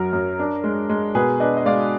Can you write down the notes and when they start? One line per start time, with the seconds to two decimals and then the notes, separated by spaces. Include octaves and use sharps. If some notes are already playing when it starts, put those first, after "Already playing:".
Already playing: F#2 F#3 F#4 A#4
0.13 F#2
0.40 D4
0.64 G#3
0.89 G#3
1.15 B2 G#4 B4
1.40 D4 B4 D#5
1.57 D#5
1.65 G#3 D5 F5